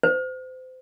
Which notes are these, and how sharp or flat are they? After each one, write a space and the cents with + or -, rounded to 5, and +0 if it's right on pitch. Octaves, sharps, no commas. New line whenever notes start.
C5 -30